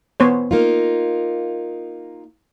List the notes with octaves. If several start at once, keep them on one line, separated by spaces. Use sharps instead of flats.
B3 C5 C#5
A#3 D#4 F4